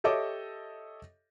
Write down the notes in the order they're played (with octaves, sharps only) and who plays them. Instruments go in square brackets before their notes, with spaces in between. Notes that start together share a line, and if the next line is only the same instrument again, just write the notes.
[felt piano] G4 A4 C#5 D#5 E5 D6